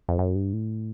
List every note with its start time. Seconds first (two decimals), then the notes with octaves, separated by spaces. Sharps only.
0.09 F2
0.19 F#2
0.35 G2
0.53 A2